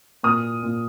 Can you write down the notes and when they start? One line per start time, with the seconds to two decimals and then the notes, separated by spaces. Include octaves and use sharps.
0.23 A#2 D#6 F6
0.63 A#2